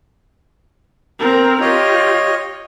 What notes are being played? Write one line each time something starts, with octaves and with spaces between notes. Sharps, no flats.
C4 A#4
F4 G4 C#5 D#5